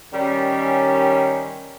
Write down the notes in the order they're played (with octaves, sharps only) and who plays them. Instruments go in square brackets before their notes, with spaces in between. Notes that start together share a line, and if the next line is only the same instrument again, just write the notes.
[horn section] D#3 G3 C#4